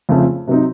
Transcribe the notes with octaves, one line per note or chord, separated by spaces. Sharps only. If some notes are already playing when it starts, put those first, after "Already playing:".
F2 C#3 F3 A3 C4
C3 F#3 C4 D#4